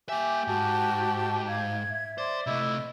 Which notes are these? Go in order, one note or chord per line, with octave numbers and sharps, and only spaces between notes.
A#3 G4 E5 G#5 D6
G#2 F#4 A5
F5 G#6
E5
C5 D5 C6
C3 A3 E4 D#5